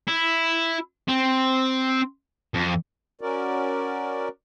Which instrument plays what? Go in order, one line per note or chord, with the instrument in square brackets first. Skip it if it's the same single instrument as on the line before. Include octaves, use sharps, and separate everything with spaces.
[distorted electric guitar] E4
C4
F2
[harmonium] C#4 F#4 A#4 D5